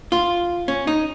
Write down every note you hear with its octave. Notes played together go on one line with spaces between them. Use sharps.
F4
C#4
D#4